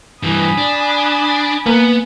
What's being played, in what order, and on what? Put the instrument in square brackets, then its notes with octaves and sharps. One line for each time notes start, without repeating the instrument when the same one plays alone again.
[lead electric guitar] G2 E3 [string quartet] G#5 B5 D#6
[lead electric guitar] D4
[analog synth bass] A#3 [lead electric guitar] B3